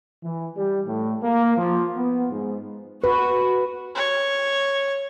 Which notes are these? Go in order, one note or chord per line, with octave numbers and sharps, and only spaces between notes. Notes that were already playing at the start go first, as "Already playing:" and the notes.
E3
G3
A2
A#3
F3
B3
G#2
F#4 B4
C#5